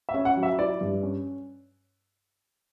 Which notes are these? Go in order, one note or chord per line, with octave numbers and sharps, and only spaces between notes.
E5
C#4
F#5
F#3
E5
E4 D5
G2
C#4